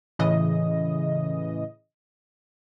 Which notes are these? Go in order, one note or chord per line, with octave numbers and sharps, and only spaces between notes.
A2 C#3 E3 D#5